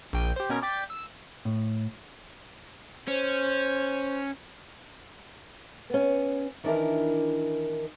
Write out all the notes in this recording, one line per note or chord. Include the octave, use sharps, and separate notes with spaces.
A#1 G5 D#7
G4 C5
B2 C#4 A#4 G#6 D7
D5 G5 G6 A6 B6
E6
A2
C#4 C5
B3 C#4
D#3 E3 D4 E4 A#4